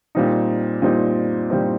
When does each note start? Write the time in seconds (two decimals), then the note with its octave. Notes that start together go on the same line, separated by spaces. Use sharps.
0.15 A#2 G3 C4 D#4
0.82 A#2 G3 C4 D#4
1.50 A#2 G3 C4 D#4